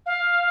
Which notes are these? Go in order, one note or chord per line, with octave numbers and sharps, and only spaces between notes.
F5